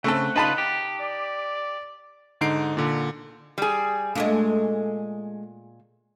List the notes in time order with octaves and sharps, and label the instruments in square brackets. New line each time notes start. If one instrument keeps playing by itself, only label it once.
[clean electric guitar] C#3 [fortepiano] A3 C4 A4 [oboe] F#5
[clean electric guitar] C#3 F4 B4 [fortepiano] D#4 A5 B5
[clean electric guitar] G4
[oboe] D5
[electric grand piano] G#2 D3 D#4 C7 D7
A#2 D3
[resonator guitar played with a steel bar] G3 G#4
[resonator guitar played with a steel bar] A#2 [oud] G#3 A3 D4